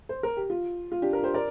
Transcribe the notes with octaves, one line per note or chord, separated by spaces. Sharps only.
C5
A#4
G4
F4
F4
D4 G4
F4 A#4
G4 C5
A#4 D5